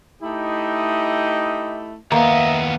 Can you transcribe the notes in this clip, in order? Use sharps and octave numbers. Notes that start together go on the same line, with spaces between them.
A3 D#4 E4 G4 D#5
D#2 A#3 B3 D#5 E5 A#5